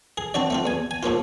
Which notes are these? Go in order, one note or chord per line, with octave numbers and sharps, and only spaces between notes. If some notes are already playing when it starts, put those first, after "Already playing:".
G#4
C4 D4 F#4 D5
A3 C4 F4
E2 G#5
G#5
G#2 F3 A#3 F4